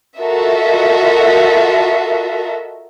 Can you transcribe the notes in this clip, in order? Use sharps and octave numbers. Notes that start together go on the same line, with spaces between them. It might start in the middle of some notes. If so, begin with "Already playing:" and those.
F4 F#4 A4 A#4 D#5 E5